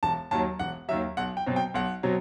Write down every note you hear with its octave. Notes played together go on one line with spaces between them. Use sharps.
E1 A5
D#2 D#3 F#3 A5
E1 F#5
D#2 D#3 F#3 E5
B1 F#5
G5
B2 F#3 C4
G5
B1 F#5
B2 F#3 C4